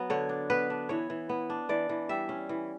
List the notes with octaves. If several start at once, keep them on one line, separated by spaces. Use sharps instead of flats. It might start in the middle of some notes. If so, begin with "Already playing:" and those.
Already playing: F#3 B3
D3 C#5
D4
B3 B4
D4
E3 C#5
E3
B3
D4
E3 D5
E3
G3 E5
C#4
E3